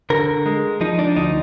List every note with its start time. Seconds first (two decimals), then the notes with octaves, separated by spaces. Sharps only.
0.10 D3 A#4
0.46 G#3
0.81 F3 D#4
0.99 D4
1.16 D2 D#4